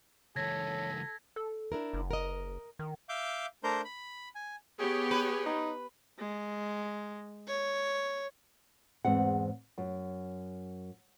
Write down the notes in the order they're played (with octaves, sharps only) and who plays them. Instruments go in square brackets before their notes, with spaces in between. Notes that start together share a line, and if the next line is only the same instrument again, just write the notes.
[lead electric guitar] C#2 E3 [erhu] A4 [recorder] C#5 [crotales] G#6 A#6 B6
[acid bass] A4
[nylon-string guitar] D4 E4 A#4
[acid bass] F#1
[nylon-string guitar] A#4 D#5
[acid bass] D#3
[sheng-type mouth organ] E5 F5 D6 G6
A3 D4 A#4 C5 A#5 G6
B5
G#5
[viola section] B3 G4 C#5 [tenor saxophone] G#4
[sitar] B4
[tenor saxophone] D#4
[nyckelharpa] G#3
C#5
[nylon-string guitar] E2 G#2 C4 F#5
F#2